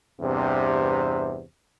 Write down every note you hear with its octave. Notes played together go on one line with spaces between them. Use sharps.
E2 G2 C3